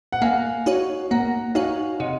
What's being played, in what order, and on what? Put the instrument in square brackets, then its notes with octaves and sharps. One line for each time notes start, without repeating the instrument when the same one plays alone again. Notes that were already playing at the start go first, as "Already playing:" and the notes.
[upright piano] F#5
[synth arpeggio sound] A#3 [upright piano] F5 G#5
[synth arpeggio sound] D#4 F#4 C#5
[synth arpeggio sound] A#3 [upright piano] F#5 A#5
[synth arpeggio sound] D#4 F#4 C#5 [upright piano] F5 G#5
[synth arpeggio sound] C3 [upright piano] D#5 F#5